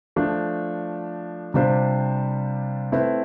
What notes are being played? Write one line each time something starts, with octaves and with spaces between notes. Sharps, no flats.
F3 A3 D4
C3 G3 D4 F4 C5
A3 C4 E4 B4